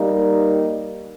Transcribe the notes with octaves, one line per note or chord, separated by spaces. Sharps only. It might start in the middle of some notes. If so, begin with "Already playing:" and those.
Already playing: G3 A#3 D#4